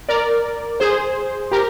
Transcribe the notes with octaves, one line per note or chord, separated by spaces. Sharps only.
A#4 D5
G#4 C5
G4 A#4